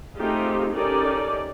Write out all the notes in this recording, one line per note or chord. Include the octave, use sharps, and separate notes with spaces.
A3 C4 D#4 F4 G4 G#4
C#4 D#4 G4 A4 A#4 D5